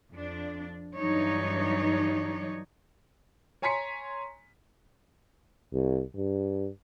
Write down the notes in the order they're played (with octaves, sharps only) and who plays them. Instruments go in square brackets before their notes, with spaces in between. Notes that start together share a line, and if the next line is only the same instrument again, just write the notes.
[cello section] F2 D4
G2 E3 F#3 D4 D#4 C#5
[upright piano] C#5 G#5 A#5 C6 B6 C#7
[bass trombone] C2
G2